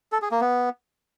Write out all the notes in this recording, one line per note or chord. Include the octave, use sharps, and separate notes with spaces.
A4
G#4
A#3
B3